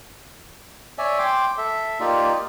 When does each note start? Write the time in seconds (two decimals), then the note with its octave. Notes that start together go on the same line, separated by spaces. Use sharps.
0.98 C#5 D5 E5 G#5
1.19 G5 C6 D6
1.58 A4 E5
2.00 A#3 D#4 F4 G4 D5